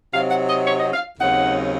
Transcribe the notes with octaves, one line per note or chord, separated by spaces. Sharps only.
C3 F#3 C4 D#4 F5
F#5
D#5
C#5
D#5
F5
D#2 C#3 F#3 C4 D#4 F#5